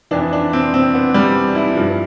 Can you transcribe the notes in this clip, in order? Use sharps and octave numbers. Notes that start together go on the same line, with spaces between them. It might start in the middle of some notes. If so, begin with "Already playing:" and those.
F2 E3 D4
D4
C4
C4
B3
G3
E4
G2 F3